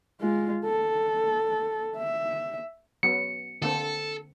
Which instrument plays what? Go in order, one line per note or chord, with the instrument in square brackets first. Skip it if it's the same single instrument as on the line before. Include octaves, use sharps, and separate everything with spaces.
[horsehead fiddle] G#3 F4
A4
E5
[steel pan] F#3 B3 [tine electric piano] C#7
[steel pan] D3 A#3 C4 [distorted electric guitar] A4